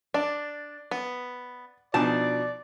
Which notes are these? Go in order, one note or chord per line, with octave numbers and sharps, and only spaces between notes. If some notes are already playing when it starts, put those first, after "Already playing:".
D4 D5
B3
B2 F3 D4 D#4 D5 G#5 A5